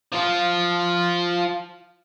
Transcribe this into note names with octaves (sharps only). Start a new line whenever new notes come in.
F3 F4